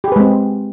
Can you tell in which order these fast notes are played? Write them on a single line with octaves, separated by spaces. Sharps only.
G4 G#4 B4 G#3 C4